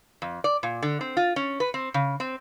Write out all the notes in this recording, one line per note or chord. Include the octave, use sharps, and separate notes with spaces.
F2
D5
A#2
D3
C4
F4
C#4
B4
C4
C#3
C4